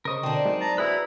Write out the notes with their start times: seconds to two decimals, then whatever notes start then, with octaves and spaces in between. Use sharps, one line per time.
0.05 C#3 A#4 C5 D#5 C#6
0.23 B2 D3 C4 D4
0.45 F#3 G#3 D#4
0.61 A5 A#5
0.78 E4 F#4 G#4 B4 A#5 B5 D#6